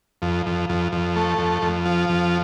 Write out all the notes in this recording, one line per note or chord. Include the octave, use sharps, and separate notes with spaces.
F2
F2
F2
F2
A3
F2
F2
F3
F2